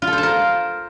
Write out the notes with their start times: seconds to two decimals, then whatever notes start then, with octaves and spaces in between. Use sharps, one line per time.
0.02 F4
0.07 A4
0.13 C5
0.18 A5
0.23 A#4